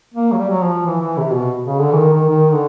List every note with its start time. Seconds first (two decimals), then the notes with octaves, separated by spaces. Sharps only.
0.14 A#3
0.32 F#3
0.38 G3
0.50 F#3
0.62 F3
0.86 E3
1.02 E3
1.18 C3
1.33 B2
1.65 C#3
1.81 D3
1.92 E3
1.97 D#3
2.13 D#3
2.29 D#3
2.52 D3